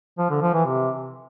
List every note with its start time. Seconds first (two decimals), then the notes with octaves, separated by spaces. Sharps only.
0.18 F3
0.30 D3
0.42 F3
0.54 E3
0.65 C3